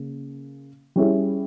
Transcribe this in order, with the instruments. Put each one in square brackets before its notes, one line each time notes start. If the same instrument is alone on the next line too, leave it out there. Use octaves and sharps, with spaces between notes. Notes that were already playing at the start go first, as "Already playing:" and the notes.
Already playing: [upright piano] C#3 A#3
G3 C#4 E4 G#4